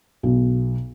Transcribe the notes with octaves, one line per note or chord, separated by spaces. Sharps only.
B1